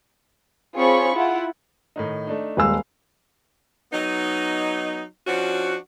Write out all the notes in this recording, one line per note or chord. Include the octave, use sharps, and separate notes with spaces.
C4 F4 G#4 C#5 B5 C#6
E4 F4 F#5
A2 D#3 D#4
A3 D4 D#4
D#1 G#3 B4 F5 E6
F#3 B3 D#4
F3 C#4 D4 F#4